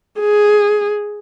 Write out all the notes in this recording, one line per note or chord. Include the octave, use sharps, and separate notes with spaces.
G#4